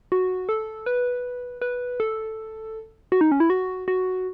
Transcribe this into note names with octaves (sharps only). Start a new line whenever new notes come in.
F#4
A4
B4
B4
A4
F#4
D#4
C#4
E4
F#4
F#4